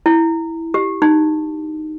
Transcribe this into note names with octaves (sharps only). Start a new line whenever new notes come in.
E4
G4
D#4